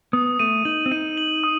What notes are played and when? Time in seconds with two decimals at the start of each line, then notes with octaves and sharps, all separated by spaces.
0.13 B3 D#6
0.39 A3 D#7
0.65 D#4 F#7
0.86 C4
0.91 D#4 D#7
1.17 F#7
1.44 D#6